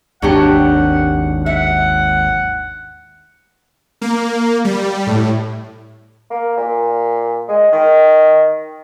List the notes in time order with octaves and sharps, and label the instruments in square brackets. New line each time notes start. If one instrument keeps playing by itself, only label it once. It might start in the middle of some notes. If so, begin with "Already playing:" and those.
[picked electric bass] G#1 D#2 [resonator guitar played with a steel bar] F#3 D4 G4 [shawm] F#5
[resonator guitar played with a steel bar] E5 [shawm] F#5
[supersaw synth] A#3
G3
A2
[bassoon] A#3
A#2
G#3
D#3